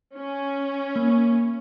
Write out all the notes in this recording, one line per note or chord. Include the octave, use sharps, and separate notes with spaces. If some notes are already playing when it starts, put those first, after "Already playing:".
C#4
A#3